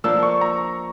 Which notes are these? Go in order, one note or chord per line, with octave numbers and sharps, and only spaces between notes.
F3 A#3 D4 E6
C#6
A#5